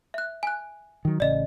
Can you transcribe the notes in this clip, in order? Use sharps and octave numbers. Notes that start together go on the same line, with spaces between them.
E5 F#6
G#5 F#6
D#3 F#3
A1 C#3 D5 D#5